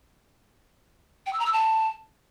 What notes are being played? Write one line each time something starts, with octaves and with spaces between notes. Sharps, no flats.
G5
E6
A#5
E6
A5